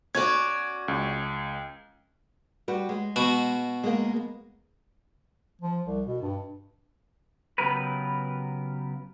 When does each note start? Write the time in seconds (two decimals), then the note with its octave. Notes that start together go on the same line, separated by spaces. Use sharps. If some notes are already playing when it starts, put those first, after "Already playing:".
0.15 C#4 F#4 D5 G#6
0.88 C#2
2.68 G3 F#4 B4
2.89 G#3
3.16 B2 F#4
3.84 G#3 A#3
5.62 F3
5.85 C2
6.07 B2
6.22 G2
7.58 C#3 F#3 B3 G4 A#4 B4